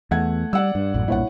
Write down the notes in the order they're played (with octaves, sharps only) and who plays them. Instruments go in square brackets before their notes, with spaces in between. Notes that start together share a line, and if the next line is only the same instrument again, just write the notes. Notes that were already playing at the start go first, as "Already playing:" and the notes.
[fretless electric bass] E2 [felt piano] A3 F#5 G#6
[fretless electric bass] G3 [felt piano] D5 F#5 E6
[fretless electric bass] G2
A1 F#2 A2
[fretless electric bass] B1 G2 A#2 [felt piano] E4 C#5 F#5